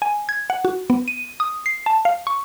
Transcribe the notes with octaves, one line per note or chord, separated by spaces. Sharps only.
G#5
G#6
F#5
F#4
B3
D#7
D#6
C7
A5
F5
C#6